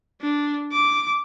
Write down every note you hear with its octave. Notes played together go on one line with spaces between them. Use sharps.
D4
D6